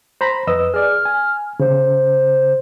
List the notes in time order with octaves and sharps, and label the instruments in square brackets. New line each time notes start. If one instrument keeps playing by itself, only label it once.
[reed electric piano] C5 A#5 B5
[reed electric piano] F2 D#5 E6 [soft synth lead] B4
[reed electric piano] G#4 D5 [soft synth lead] F6
[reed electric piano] G#5
[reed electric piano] C#3 [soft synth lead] C5